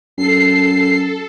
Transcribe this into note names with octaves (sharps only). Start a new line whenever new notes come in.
F#2 A4 C7